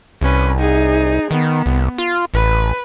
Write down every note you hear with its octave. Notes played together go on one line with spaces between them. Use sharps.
C2 C#4 B4
D#4 G#4
D#3 B3
C2
F4
A1 B4